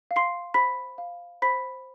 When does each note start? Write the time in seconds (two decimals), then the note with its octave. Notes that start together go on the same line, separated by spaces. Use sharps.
0.11 F5
0.16 C6 C7
0.54 C5 B5 B6
0.98 F5
1.42 C5 B5 B6